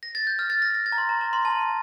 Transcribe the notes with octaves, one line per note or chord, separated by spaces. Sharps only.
A#6
A6
G6
F6
A6
A#6
A#6
A6
A#5
C6
A#5
A#5
C6
A5